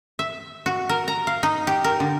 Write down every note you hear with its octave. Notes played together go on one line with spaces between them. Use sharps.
E5
F#4
A#4
A#5
F5
D#4
G4
A#4
D3